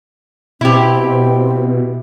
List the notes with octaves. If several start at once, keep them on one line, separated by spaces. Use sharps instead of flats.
B2 C4 E4 G4